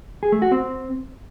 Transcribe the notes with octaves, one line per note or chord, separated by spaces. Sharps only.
G#4
A3
F#4
C4